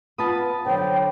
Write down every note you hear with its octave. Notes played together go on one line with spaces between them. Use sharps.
B3 F4 A5 B5 D#6
D3 F#3 C5 G5